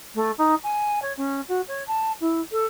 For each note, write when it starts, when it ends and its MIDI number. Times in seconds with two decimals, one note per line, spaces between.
0.15 0.31 57
0.38 0.55 63
0.63 0.99 80
1.02 1.13 73
1.17 1.41 61
1.48 1.61 66
1.68 1.83 73
1.87 2.12 81
2.20 2.41 64
2.52 2.66 69